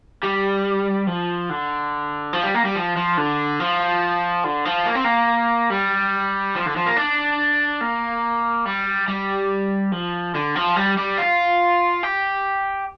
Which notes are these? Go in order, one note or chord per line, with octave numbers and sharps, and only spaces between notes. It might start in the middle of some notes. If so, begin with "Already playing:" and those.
G3
F3
D3
F3
G3
A#3
G3
F3
F3
D3
F3
D3
F3
A#3
C4
A#3
G3
F3
D3
F3
A#3
D4
A#3
G3
G3
F3
D3
F3
G3
G3
F4
G4